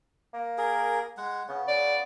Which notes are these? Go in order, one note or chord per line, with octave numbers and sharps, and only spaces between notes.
A#3
G#4 A#4
G#3 F#5
C#3 B3
C#3 D5